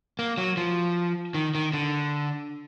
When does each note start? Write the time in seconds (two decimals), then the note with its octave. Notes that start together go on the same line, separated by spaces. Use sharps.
0.19 A#3
0.38 F#3
0.57 F3
1.34 D#3
1.55 D#3
1.73 D3